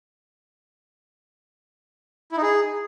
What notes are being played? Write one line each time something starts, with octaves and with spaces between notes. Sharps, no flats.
E4
D#4
G#4